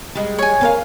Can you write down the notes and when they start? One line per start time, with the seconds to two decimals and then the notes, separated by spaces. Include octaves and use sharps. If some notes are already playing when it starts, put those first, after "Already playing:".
0.15 G3 G#3
0.39 C#5 G#5
0.61 C4 A#4 F5